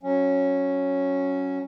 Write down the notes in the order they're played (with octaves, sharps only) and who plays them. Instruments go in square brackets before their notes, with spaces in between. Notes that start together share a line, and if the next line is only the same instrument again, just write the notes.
[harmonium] F#3 C#4